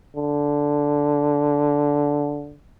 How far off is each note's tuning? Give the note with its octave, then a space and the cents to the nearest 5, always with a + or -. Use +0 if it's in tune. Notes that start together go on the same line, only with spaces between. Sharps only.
D3 -10